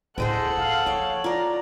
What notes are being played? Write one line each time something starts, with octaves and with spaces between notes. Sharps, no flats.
D2 A2 G#4 A4 C5 D#5 F#5 G5
F4 F5
F3 C#5 F5 G5
F4 D5 A#5